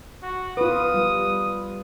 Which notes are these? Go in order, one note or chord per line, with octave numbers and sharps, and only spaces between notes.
F#4
F4 B4 D#6
G3